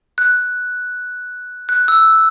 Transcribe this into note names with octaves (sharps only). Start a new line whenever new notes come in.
F#6
F#6
E6